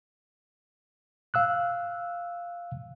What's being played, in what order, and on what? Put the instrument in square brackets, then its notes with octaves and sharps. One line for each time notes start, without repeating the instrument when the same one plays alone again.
[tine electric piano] F5 E6 F#6